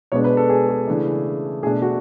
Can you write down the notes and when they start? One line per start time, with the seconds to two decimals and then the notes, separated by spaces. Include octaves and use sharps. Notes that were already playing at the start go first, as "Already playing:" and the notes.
0.12 B2 G#3 B3 D4 C#5
0.24 B4
0.37 A4
0.49 G#4
0.69 G#4
0.87 C#3 E3 A3 D4
1.63 B2 A3 D4 G#4
1.82 F#4